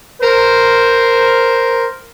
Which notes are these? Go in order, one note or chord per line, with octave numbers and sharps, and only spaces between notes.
A#4 C5